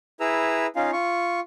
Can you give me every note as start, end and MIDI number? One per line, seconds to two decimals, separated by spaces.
0.20 0.67 64
0.20 0.67 68
0.20 0.67 71
0.20 0.67 82
0.20 0.67 88
0.76 0.91 61
0.76 0.91 63
0.76 0.91 65
0.76 0.91 77
0.93 1.40 65
0.93 1.40 85